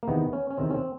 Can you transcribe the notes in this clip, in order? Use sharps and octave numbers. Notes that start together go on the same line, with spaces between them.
A#3
E2 C3 D#3 B3
C#4
C#4
E2 C3 D#3 C4
C#4
C4